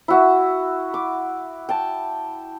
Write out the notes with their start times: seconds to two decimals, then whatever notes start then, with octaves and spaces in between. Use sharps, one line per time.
0.08 E4 F#4 E5
0.94 D6
1.69 G5 A5